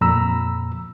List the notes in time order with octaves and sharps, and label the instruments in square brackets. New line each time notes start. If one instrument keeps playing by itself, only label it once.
[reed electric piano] F2 A#2 A#5 B5 E6